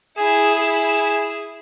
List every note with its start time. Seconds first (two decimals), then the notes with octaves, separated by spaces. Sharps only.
0.18 E4 G#4 E7
0.55 G#4